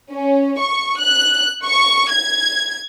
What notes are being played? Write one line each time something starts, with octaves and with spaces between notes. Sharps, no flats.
C#4
C#6
F#6
C#6
G#6